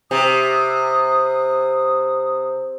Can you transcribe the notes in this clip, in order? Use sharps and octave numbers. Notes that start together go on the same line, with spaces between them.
C3 D#6